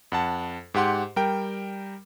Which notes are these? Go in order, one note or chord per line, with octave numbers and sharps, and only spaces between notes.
F2 F#5 A5
G#2 G4 F#5 C6
G3 A#4 G5